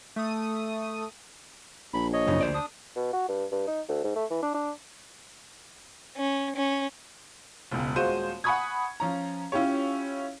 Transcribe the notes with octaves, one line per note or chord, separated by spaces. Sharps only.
A3 D#6
A#1 B5
C#5 D#5
F#2 C#3 D#4
D2 C5 D5
D4 D#6
B2
F#4
G2
G2
D#4
D2
G#2
A3
E3
D4
D4
C#4
C#4
E1 C#2
D#1 G#3 F4 F#4 C5 D#7
F#5 G#5 B5 C#6 D#6 G#6
F3 C#4 A#5
C#4 E4 F4 G4 C#5